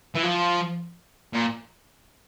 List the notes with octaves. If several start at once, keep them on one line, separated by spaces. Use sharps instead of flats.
E3
F3
A#2